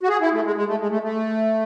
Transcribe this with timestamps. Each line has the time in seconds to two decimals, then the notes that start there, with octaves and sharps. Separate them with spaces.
0.03 F#4
0.09 G#4
0.21 E4
0.33 A3
0.45 G#3
0.56 G#3
0.68 A3
0.79 G#3
0.90 A3
1.03 A3